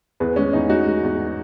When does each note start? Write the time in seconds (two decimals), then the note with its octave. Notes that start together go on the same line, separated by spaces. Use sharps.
0.20 E2 G#4 B4
0.36 G#3 C#4
0.53 E2 D#4
0.70 G#3 D#4 F#4
0.86 G#3
1.03 E2